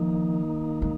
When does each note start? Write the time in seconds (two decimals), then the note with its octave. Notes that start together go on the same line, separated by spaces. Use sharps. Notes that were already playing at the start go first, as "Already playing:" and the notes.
Already playing: D#3 F3 A#3 D#4
0.82 G#3